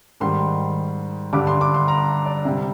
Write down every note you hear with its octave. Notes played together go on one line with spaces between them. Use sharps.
G#2 D#3 G3 C6
G2 D3 G3 D6
C6
D6
C6
A#5
D5
C3 G3